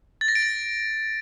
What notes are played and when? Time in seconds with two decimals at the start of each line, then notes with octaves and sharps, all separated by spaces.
0.21 A6
0.28 A#6
0.35 D7
0.43 A#6